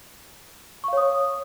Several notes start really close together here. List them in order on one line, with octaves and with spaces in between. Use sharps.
C#6 F5 C#5 D#6